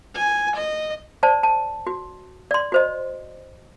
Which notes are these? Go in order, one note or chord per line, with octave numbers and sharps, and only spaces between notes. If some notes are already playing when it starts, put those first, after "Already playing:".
G#5
D#5
C5 D5 A5
A5
F#4
D5 C6
F#4 C5 D#5